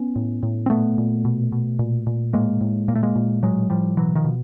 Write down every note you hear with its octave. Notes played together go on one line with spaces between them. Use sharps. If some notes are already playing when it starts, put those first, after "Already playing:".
Already playing: B3 C#4
A2
A2
C4
A#2 A3 B3
A#2
B2
B2
A#2
A#2
A2 G#3 A#3
A2
A#2 A#3
A3
G#3 A#3
A#2
A2 F#3 G#3
A2 F3 G3
B2 E3 F#3
D#3 F3
B2